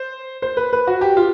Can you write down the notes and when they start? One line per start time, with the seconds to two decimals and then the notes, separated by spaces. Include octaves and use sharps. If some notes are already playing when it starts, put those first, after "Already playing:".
Already playing: C5
0.42 C5
0.57 B4
0.73 B4
0.87 F#4
1.01 G4
1.17 F4